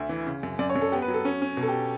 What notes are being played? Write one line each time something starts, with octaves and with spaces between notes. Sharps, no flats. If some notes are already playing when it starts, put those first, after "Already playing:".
Already playing: D2 E5
E3
C#3
F#2
F#2 D5
C#5
F#2
A4
B3 G4
B4
F#3
A4
C#4
C#4
B2
A4
G4